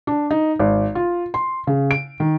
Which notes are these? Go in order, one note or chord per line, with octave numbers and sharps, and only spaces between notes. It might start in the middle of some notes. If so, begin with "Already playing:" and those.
D4
D#4
G#1
F4
C6
C#3
D7
D#3